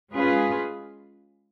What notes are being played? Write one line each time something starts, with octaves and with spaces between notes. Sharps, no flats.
G#3 C#4 F4 G#4 B4